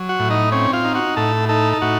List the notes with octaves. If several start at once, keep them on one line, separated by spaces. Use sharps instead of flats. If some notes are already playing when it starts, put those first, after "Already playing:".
Already playing: F#3
F#4 F#5
A2
D#4 D#5
C4 C#4 C#5
F4 F5
D#4
F#4 F#5
A2 A4 A5
D#4 A4 A5
A5
A2 F#4 F#5